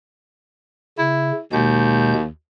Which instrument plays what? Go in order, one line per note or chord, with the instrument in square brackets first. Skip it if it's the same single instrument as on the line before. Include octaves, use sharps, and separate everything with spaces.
[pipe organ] C#3 [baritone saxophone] E4
[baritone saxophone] D#2 [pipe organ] B2 G#3 G6